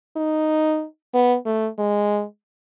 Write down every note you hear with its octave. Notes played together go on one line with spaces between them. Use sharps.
D#4
B3
A3
G#3